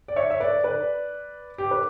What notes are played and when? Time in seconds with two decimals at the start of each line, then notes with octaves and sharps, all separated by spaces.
0.08 D5
0.16 C#5 E5
0.31 E5
0.40 B4 D5
0.64 B4 D5
1.58 G4
1.71 B4